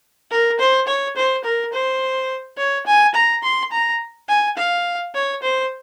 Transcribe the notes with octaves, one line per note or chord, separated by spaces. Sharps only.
A#4
C5
C#5
C5
A#4
C5
C#5
G#5
A#5
C6
A#5
G#5
F5
C#5
C5